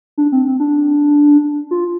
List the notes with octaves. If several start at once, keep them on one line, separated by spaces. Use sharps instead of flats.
D4
C4
C4
D4
F4